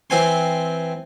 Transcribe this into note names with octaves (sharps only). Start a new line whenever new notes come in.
E3 C4 G#5 C6